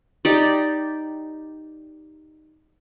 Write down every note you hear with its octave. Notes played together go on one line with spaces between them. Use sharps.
D#4 G4 D5